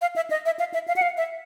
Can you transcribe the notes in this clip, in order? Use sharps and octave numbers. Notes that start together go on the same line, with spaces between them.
F5
E5
D#5
E5
F5
E5
F5
F#5
F5
E5